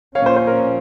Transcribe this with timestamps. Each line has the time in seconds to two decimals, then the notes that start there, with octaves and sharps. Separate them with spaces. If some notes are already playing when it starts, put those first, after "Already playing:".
0.15 A#2 F3 A#3 C#4 C#5 F5
0.26 C5
0.36 C5
0.47 A#4